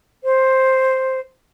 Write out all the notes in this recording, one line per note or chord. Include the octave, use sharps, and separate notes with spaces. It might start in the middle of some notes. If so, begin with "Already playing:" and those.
C5